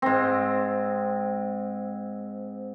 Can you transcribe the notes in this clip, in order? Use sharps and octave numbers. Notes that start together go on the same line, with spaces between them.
G#2 C4